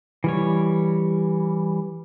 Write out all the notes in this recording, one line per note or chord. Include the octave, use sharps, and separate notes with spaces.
E3 G3 C#5